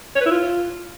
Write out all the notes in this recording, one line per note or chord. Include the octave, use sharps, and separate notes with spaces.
C#5
B4
E4
F4